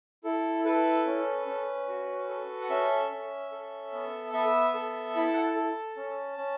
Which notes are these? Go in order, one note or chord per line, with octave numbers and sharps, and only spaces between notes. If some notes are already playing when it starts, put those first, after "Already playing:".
E4 A4
A4 B4
C#4
C#4
F#4
A4
F#5
C#4 E5
C#4
A4
B3
B3 E5
A4
E4 B5
A5
F#5
A5
A4
C#4
C#4